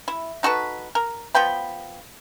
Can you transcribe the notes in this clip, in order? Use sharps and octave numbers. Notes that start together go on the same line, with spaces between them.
E4
D#4 F#4 A4 B4
A#4
F3 B3 G5 B5